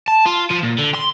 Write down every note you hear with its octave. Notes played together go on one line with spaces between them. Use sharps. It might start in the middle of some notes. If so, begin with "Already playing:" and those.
A5
F4
F3
A#2
D3
C6